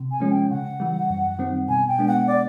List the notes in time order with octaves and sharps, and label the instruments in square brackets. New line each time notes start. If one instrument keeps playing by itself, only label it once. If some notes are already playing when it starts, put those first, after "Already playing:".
Already playing: [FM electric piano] C3
[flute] G#5
[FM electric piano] F3 G#3 C#4
[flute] G5
[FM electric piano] C#3 [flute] F#5
[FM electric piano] E3 G3
F#2
D#3 G3 C4
[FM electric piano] B2 [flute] G#5
[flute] G5
[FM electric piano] G#3 B3 D4
[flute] F#5
D5